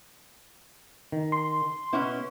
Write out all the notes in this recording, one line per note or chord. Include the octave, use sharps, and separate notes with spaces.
D#3
C6
B2 B3 C#4 E4